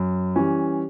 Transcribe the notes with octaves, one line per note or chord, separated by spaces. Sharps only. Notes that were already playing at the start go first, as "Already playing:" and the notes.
Already playing: F#2
E3 G3 C#4